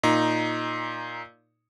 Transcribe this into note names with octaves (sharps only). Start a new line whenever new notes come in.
A#2 D#4